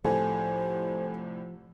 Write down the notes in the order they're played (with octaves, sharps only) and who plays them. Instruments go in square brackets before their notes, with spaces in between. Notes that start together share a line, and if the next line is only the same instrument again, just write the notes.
[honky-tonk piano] C2 A2 C3 [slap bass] F3 [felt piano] A4 G#5 [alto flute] C5